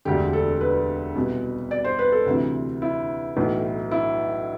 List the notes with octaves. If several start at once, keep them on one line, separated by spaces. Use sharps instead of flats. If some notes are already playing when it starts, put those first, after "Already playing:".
E1 D2 D3 G4
A4
B4
C2 B2
D5
C5
B4
A4
D2 C3 E3
E4
B1 A2 E3
E4